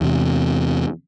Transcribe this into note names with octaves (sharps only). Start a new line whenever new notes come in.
E2 C3